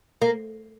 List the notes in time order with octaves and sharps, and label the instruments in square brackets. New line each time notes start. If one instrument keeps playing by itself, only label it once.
[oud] A#3